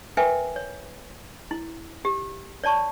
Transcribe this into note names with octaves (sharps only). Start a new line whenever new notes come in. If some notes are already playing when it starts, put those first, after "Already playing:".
A#4 B4 E5 G5 G#5
C#5
E4
G4
C#5 D5 A5 C#6